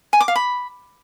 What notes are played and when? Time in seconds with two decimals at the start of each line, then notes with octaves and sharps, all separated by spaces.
0.13 G#5
0.20 D6
0.28 F5
0.36 B5